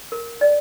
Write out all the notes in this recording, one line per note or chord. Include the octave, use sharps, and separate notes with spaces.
A#4
D5